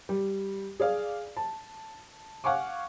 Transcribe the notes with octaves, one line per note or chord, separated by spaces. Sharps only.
G3
G#4 D5 F5
A5
F5 F#5 G#5 C#6 D6